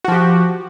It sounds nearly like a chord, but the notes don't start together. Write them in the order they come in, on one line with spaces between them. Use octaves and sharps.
F#4 F3 G4